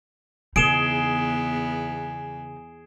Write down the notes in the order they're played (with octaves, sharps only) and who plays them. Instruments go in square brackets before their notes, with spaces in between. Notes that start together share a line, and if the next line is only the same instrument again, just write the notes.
[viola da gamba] E2 B3 [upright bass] C#3 D#4 [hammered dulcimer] G#4 [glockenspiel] D7 E7 G7